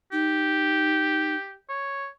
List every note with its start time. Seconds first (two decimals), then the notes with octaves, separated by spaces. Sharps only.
0.12 D#4 G4
1.69 C#5